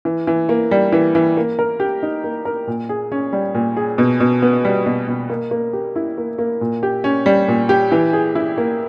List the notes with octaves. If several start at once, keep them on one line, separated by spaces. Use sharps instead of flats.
E3
E3
A#3
G3
E3
E3
A#3
A#4
G4
D#4
A#3
A#4
A#2
G#4
C#4
G3
A#2
G#4
B2
B2
B3
G3
B2
B2
A#3
A#3
G4
E4
A#3
A#3
A#2
G4
C#4
G3
A#2
G4
E3
G#4
E4
A#3